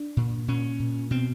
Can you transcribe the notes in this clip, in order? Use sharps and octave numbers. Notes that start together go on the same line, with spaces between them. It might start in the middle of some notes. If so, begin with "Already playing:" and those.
Already playing: D4
A#2
A#2 C#4
A#2
B2 C4